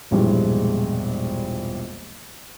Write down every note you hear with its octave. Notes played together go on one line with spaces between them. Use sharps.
E1 A#1 G2 G3 G#3 E4